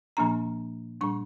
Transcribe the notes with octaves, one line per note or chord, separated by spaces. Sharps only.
A#2 F3 A#3 D4 A#5
A#2 G3 D4 C#6